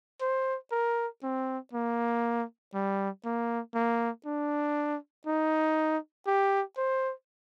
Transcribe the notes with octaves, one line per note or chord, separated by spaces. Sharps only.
C5
A#4
C4
A#3
G3
A#3
A#3
D4
D#4
G4
C5